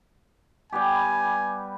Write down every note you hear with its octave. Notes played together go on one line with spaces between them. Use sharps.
G3 B3 G4 G#5